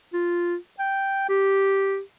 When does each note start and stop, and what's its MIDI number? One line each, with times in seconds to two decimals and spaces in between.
0.13 0.55 65
0.79 1.26 79
1.29 2.00 67